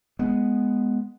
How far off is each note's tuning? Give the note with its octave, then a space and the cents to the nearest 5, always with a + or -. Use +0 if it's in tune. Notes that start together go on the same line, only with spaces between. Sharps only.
G#3 +0 B3 +0